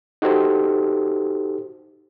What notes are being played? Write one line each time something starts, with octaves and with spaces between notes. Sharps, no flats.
D#4 F#4 G4 A4 C5